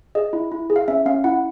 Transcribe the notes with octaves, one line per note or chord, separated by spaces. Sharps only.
G#4 D#5
E4
E4
G#4
F5
C#4 E5
C#4 F5
E4 F#5